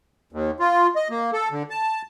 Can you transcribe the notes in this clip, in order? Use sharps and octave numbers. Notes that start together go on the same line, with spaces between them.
D#2
F4
D#5
A#3
A4
D3
A5